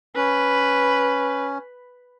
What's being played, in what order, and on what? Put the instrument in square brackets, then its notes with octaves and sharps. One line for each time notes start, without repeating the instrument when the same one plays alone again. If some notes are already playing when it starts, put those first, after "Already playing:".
[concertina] C#4 [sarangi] B4